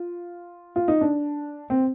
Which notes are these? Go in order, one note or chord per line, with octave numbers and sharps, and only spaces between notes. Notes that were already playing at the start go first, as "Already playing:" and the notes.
Already playing: F4
F4
D#4
D4
C4